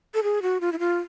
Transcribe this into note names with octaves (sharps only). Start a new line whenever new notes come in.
A4
G#4
F#4
F4
E4
F4